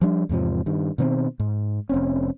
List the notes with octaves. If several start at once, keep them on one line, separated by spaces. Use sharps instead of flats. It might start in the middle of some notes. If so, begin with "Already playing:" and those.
F3 G3 D4
E2 G#2 C3 F3
G2 D#3
B2 D#3 B3 C4
G#2
F1 C4 C#4